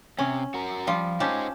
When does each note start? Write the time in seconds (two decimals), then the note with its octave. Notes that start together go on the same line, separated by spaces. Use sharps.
0.19 C3 C#4
0.54 F#4 A#4
0.87 F3 G3 F4
1.20 C#4 D#4 G4 C5 A5